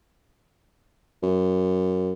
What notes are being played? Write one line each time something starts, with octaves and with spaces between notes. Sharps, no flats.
F#2